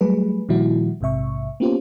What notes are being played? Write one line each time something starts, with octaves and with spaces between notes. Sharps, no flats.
F#3 G3 A3 G#4 B4
A#2 D#3 F3 G3 E4 F#4
A#1 G#2 C3 E5 C#6
A#3 B3 C#4 F4 G4 C5